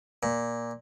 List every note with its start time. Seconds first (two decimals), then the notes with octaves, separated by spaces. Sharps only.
0.23 A#2